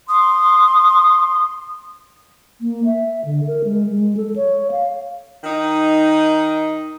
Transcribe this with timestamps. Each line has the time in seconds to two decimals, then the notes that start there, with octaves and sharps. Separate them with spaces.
0.09 C6 D#6
2.61 A#3
2.86 E5
3.25 D3
3.47 A#4
3.64 G#3
3.92 G#3
4.17 A4
4.36 C#5
4.71 F5
5.44 D#3 D#4